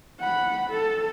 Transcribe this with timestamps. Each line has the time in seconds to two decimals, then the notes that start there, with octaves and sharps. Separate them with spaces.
0.20 F#5 B5
0.71 A4